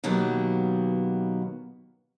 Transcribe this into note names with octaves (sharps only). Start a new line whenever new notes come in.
B2 D#3 F#3 A#3 B3 G4